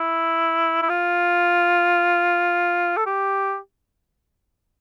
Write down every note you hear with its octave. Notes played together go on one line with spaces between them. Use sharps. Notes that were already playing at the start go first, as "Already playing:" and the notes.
Already playing: E4
E4
F4
A4
G4